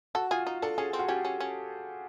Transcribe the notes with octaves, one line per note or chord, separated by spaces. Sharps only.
F#4 A4
F4 G#4
D#4
D4 A4
C#4 G#4
C4
F#4
C#4 G4
C#4
C#4